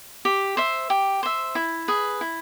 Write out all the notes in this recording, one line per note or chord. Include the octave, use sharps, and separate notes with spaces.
G4
C5 E5
G4
C5 E5
E4
G#4 B4
E4